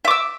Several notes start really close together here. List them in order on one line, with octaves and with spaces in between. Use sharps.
E5 D6 E6